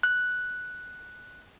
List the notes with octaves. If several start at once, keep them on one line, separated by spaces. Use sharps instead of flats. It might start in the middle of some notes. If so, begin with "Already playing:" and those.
F#6